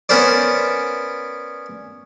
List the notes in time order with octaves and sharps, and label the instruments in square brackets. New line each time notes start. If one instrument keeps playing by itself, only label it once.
[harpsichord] B3 C#4 A#4 C5 D5